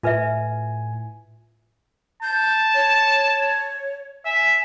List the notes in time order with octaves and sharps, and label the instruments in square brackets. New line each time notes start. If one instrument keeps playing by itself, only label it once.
[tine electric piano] A2 G#5 [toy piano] F4 B4 E5
[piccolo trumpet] A5 [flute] G6
[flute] C#5
[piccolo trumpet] E5 [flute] G#5